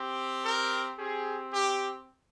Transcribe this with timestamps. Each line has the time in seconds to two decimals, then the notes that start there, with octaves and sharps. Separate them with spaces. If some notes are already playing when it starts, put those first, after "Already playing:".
Already playing: C4 G4
0.44 A#4
0.98 C4 G4 G#4
1.52 G4